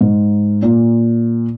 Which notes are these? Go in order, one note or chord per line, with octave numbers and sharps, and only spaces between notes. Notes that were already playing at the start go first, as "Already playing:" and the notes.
G#2
A#2